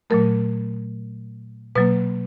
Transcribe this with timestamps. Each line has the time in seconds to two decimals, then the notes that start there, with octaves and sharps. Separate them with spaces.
0.10 A#2 F#3 A3 A#4
1.76 B2 F#3 A#3 B4